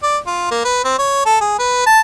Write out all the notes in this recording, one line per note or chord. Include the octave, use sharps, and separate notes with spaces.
D5
F4
A#3
B4
C4
C#5
A4
G#4
B4
A5